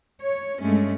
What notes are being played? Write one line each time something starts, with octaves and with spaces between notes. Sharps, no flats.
C#5
G2 G#3 A3 C#4